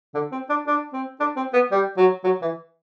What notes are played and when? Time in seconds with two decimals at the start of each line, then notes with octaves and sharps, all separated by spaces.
0.14 D3
0.32 C4
0.49 D4
0.67 D4
0.93 C4
1.20 D4
1.36 C4
1.53 B3
1.71 G3
1.97 F#3
2.24 F#3
2.42 E3